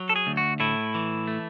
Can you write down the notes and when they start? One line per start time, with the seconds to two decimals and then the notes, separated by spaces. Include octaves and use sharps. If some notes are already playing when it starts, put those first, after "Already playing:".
Already playing: F#3
0.09 A4
0.16 G#4
0.27 D2
0.37 F#4
0.60 A2 E4
0.95 E3
1.28 A3